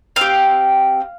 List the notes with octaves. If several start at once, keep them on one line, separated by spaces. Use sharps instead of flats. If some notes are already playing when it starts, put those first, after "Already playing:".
C4 G4 F5